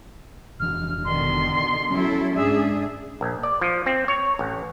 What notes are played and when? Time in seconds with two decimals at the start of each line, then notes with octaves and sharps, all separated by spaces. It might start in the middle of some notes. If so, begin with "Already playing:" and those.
0.60 F1 E3 F6
1.05 B2 D3 D#3 C6
1.91 F#3 C#4 E4 A4
2.35 G#2 D4 G#4 E5
3.21 A#1
3.43 D5
3.61 F3
3.86 C4
4.08 C#5
4.39 A1